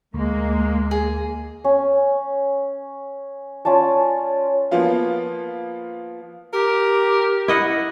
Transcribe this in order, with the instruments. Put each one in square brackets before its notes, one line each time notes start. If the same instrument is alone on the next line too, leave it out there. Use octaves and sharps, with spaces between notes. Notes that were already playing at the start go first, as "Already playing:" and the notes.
[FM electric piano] D2 [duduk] G#3 [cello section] A#3
[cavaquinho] G#4
[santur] C#4
C#4 F4 D5 A5
[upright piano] F3 A#3 B3 F4
[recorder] G4 [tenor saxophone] A#4
[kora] E4 D#5 F#5